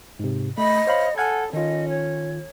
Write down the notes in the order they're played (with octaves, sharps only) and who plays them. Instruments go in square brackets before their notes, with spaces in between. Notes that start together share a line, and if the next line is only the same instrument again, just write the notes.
[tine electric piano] G#2 C3
[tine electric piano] A3 [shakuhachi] D#5 [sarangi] B5
[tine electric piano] C5 F5 B5 [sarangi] C#5
[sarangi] A4 [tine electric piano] F#5 F6 G#6 [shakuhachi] G#5
[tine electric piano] D#3 F4 [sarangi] C#4 [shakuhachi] D#5
[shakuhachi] C#5